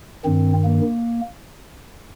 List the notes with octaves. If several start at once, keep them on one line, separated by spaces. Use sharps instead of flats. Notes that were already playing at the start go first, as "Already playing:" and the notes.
G2 D#3 C4
A#3